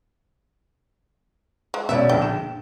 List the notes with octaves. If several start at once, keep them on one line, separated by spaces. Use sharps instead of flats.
G#3
B2 C#4 D5 E5
A#1 D3 G5
E7